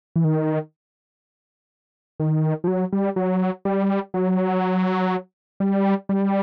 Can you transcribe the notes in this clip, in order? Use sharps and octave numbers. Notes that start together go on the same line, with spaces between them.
E3
D#3
D#3
F3
F#3
G3
F#3
G3
F#3
G3
G3